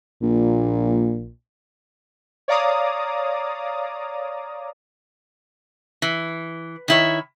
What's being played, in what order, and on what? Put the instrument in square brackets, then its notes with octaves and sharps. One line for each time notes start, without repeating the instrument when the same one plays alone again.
[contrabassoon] A#1 [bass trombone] A#2
[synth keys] C#5 D5 F5 A#5 D6 D#6
[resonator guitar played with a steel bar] E3
D#3 E4 C#5